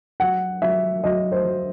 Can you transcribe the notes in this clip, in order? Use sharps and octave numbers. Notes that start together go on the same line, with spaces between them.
F#3 F#5
F#3 E5
F#3 D#5
C5
F#3